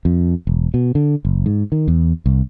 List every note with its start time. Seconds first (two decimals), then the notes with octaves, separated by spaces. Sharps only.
0.05 F2
0.47 E1
0.74 B2
0.95 D3
1.25 F#1
1.46 G#2
1.72 D#3
1.88 E2
2.26 C2